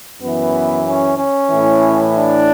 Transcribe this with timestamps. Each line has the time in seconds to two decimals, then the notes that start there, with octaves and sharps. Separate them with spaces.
0.21 F#2 E3 B3
0.86 C#4
1.18 C#4
1.51 A2 E3
2.16 D4